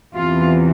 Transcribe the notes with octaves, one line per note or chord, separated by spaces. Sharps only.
E2 C3 E3 F4